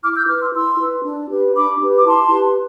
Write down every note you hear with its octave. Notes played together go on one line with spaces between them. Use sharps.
E4 D6 F6
E6 G6
B4 D6 F6
C6 E6
E4 C6 E6
B4
D4
G4 B4
D4 B5 D6
G4 B4
D6
E4 A5 C6
G4 B4